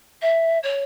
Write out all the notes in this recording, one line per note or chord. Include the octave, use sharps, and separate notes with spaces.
E5
C#5